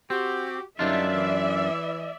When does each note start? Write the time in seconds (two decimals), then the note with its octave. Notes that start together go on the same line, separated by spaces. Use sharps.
0.10 C4 F#4 G4
0.79 F#2 D3 G3 D4 D#4 F4 D5 E5
1.14 E3